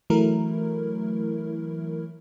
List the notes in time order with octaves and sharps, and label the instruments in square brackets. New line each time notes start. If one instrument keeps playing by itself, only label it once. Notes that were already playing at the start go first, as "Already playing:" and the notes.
[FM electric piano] E3 F#3 A3 E4 A#4